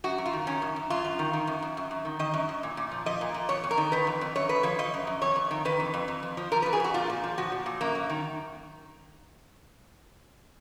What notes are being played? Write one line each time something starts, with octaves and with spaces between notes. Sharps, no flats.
F#2 F#4
F#2
F4
D#3
D#3 C#4
F#2
F#2
F#2 F4
F#2
D#3
D#3
F#2
F#2
F#2
F#2
D#3
D#3 D#5
F#2
F#2
A#2
A#2
F3
F3 D#5
A#2
A#2
F2 C#5
F2
A#4
D#3
D#3 B4
F2
F2
F#2 C#5
F#2 B4
F3 C#5
F3 D#5
F#2
F#2
F2 C#5
F2
D#3
D#3 B4
F2
F2
F2
F2
F3
F3 A#4
B4
F2
G#4
F2 F#4
A#2 F4
A#2
F3
F3 F#4
A#2
A#2
F#2 A#3
F#2
D#3